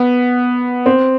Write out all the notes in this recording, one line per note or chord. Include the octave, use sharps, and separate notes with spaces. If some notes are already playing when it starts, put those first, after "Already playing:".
Already playing: B3
C4